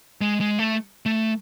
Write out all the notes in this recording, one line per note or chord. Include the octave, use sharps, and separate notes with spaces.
G#3
G#3
A3
A3